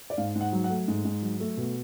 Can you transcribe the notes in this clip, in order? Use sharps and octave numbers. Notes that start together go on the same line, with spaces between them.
D5
G#2 F5
G#2
F#5
F#3
F#5
A3
G#2
G#2
F#3
A3
B2